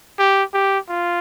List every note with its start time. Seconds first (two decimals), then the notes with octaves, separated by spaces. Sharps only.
0.19 G4
0.54 G4
0.89 F4